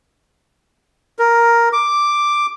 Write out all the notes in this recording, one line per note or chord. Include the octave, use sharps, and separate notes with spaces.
A#4
D6